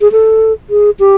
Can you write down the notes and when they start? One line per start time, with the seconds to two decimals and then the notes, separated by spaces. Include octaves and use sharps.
0.01 G#4
0.12 A4
0.70 G#4
0.99 G4